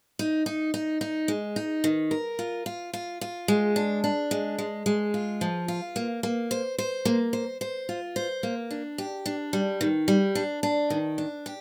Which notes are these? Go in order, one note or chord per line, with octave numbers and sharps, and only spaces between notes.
D#4
D#4
D#4
D#4
G#3
D#4
D#3
A#4
F4
F4
F4
F4
G#3
D4
D4
G#3
G#3
G#3
F4
F3
F4
A#3
A#3
C5
C5
A#3
C5
C5
F4
C5
A#3
D4
G4
D4
G3
D#3
G3
D4
D4
D#3
D4
G4